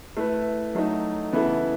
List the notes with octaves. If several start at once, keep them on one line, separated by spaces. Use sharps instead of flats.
A3 E4 B4
F#3 A3 D#4
C#3 E3 B3 E4 A4